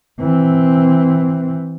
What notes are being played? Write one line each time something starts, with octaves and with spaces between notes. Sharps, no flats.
E3 C4